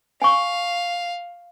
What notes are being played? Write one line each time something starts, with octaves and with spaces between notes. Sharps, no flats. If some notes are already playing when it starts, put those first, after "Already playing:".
F5 G#5 C#6